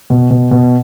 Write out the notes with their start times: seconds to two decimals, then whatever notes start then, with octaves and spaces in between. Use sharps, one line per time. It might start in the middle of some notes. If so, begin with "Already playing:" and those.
0.10 B2
0.30 B2
0.51 B2